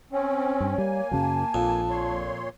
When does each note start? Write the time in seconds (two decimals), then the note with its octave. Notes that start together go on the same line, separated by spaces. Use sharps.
0.12 C4 C#4 C#5
0.60 G2
0.78 G3 A#3 G#5
1.12 F#2 C#3 F#3 A5
1.54 A#1 F2
1.90 A#2 C#5 C6